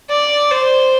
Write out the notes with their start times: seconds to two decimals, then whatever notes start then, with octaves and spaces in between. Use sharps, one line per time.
0.10 D5
0.51 C5